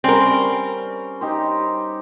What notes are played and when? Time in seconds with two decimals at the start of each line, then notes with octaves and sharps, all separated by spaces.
0.04 G3 C4 C#4 A#4
1.21 D#4 G4 C5